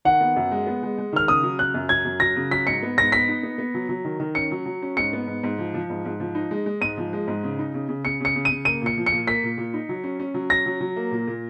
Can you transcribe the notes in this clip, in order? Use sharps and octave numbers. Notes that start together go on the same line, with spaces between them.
D#3 F#5
B3
F#2
G#3
B3
G#3
G#3
D#3 F6
C#3 D#6
F#3
C#3 F#6
F#2
F#3 G#6
F#2
F#3 A#6
C#3
F#3 B6
G#2 C#7
B3
G#2 A#6
B3 B6
D#4
B3
B3
F#3
F#3
D#3
D#3
C#4 C#7
F#3
F#3
C#4
G#2 C#7
B3
G#2
G#2
F3
F3
G#2
G#2
F3
D#4
G#3
G#3
G#2 D#7
F3
G#3
G#2
C#3
D#4
C#3
C#3
C#3 C#7
C#3 C#7
C#3
D#7
C#3
A#3 D#7
A#2 C#7
F3
C#7
A#2
A#3 B6
A#2
A#2
D#4
F#3
C#4
C#4
F#3
C#4 A#6
F#3
F#3
A#3
A#2
A#2